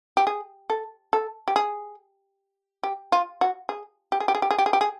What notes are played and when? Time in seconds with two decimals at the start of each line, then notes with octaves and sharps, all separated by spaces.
0.17 G4
0.27 G#4
0.70 A4
1.13 A4
1.48 G4
1.56 G#4
2.83 G4
3.12 F4
3.41 F#4
3.69 G#4
4.12 G4
4.20 G#4
4.28 G4
4.35 G#4
4.42 G4
4.51 G#4
4.58 G4
4.66 G#4
4.73 G4
4.81 G#4